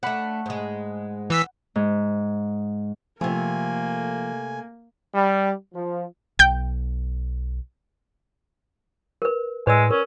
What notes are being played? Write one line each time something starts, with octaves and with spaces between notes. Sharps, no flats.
A3 D4 F#5 B5
G#2 G#3
E3 E6 B6
G#2
C3 F3 A3 A#3 G#5
G3
F3
B1 G5 G6
A#4 B4
A2 G#3 B4 D5 E6
C#4 A#4